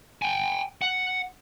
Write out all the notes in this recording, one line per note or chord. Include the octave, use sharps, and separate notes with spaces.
G5 G#5
F#5